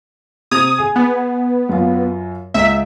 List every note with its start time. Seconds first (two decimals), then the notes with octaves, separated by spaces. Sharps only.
0.51 C3 D#6 G#6 F7
0.78 G#4
0.96 B3
1.69 F#2 F4
2.54 C#2 E5